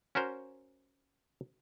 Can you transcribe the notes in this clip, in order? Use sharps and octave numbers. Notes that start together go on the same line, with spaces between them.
C#4 F#4 A#4 C5